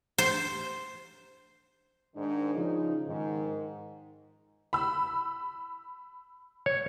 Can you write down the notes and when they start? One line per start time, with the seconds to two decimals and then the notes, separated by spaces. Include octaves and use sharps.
0.18 C5
2.15 G#2 D#3 D4
2.56 C#3 F3 D#4
3.07 G#2 D#3
4.73 B5 E6
6.66 C#5